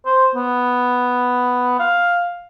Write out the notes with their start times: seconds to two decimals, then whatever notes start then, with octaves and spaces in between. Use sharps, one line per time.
0.06 C5
0.35 B3
1.79 F5